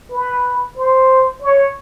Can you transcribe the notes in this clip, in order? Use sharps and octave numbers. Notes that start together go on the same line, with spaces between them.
B4
C5
C#5